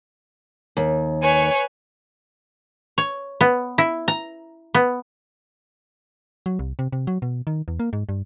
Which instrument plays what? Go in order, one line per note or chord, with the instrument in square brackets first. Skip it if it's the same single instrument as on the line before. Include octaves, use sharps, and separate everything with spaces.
[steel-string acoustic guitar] D#2
[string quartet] B4 C#5 G#5
[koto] C#5
B3
E4
A#5
B3
[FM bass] F#3
C2
C3
C3
F#3
B2
D#3
E2
A#3
G#2
G2